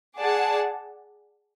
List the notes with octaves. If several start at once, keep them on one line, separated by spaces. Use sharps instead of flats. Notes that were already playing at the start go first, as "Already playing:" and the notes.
G#4 D5 F#5 A5